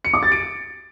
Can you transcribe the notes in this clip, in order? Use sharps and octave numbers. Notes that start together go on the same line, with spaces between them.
C#7
D6
A6
D7